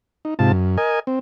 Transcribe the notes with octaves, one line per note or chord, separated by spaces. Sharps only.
D#4
G#2 C3 F4 A5
F#2
A#4 D#5 G#5
C4